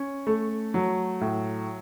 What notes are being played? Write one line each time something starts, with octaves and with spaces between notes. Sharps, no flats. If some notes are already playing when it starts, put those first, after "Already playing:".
Already playing: C#4
A3
F#3
A2